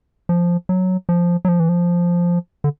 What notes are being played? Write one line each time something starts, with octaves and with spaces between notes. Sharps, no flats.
F3
F#3
F3
F#3
F3
E3
F3
D3